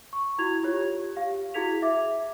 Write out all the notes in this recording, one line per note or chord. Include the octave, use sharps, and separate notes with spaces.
C#6
E4 F#4 G#6 F7
F4 G4 C#5
G4 F5
E4 F#4 G#4 G#6 B6 F7
E5 D6